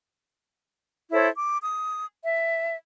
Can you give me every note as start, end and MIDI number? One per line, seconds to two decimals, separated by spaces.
1.12 1.29 64
1.12 1.29 69
1.12 1.29 72
1.12 1.29 73
1.35 1.57 86
1.62 2.04 87
2.24 2.75 76